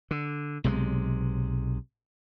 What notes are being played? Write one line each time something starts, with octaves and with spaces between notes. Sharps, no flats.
D3
B1 C3 E3 G#3